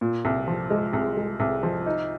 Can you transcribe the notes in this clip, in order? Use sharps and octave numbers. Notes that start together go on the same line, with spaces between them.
A#2
C2
F3
G#3
C2
G#3
C2
F3
D#4